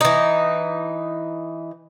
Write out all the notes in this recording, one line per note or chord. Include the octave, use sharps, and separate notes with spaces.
E3 D#4